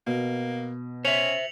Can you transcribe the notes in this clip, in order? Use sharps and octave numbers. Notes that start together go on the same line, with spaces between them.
B2 A#3
C#4 C5 E5 C#7 F7 F#7